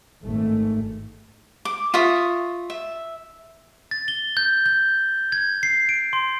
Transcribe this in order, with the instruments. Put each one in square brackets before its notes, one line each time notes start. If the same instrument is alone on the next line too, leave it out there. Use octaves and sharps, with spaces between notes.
[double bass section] G#1 G#2 A3
[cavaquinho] D6
F4 E5 C#6 D#6
E5
[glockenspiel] A6
G7
G6
G6
G#6
C7
D7
C6